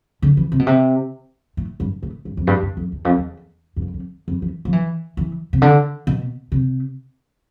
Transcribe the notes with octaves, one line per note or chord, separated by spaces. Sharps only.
D3
E3
C3
B2
C3
A2
G2
A2
G2
F2
G2
G2
F2
E2
F2
E2
G2
F2
F2
F2
E3
F3
E3
E3
C3
D3
B2
C3